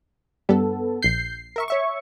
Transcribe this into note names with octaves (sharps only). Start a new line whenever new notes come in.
G2 B3 A4
A#1 G6 C7
A#4 E5 C#6
C#5 E5 C#6